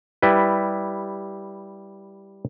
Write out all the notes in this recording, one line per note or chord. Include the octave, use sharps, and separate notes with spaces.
G3 E4 B4